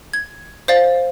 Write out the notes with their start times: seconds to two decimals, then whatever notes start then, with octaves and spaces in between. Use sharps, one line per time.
0.14 G#6
0.68 C5 D5 F5 A6